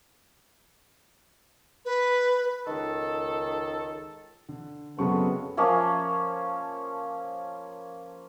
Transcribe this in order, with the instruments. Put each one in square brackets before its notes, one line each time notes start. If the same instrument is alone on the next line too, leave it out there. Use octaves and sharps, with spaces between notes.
[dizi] B4
[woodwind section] C#2 D#3 A4
[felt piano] D3
[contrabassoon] F#2 [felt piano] C#3 G#3 C#6 [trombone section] B3 C4 A4
[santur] F3 A#3 C#4 F5